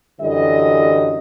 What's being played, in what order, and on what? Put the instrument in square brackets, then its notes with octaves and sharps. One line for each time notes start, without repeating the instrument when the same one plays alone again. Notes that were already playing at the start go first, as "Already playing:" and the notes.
[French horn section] F#2 D3 E3 G3 D#5